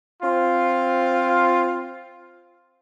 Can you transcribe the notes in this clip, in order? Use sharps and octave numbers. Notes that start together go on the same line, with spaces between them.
C4 F4